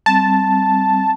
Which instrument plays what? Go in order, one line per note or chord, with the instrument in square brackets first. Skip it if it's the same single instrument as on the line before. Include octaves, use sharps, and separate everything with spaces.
[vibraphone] G3 C4 [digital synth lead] A5